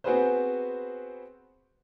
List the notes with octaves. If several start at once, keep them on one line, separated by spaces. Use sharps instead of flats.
B3 C4 F#4 G#4 B4 C5